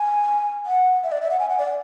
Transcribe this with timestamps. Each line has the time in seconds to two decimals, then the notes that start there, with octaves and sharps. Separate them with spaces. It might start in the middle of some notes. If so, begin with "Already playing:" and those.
Already playing: G#5
0.66 F#5
1.04 E5
1.12 D5
1.22 E5
1.31 F#5
1.39 G#5
1.50 F#5
1.58 D5